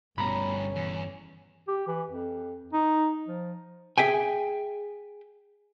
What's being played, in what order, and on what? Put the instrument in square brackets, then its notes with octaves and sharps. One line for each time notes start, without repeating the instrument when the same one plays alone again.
[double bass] G1 C#4 [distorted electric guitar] G2 B2 [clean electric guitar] A#5 B5
[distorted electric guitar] E2
[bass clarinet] G4
E3
F2
D#4
F3
[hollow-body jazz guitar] G#4 E5 G5 G#5